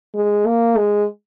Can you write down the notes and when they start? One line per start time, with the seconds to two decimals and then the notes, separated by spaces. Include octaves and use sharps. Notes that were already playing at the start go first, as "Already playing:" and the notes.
0.15 G#3
0.46 A#3
0.77 G#3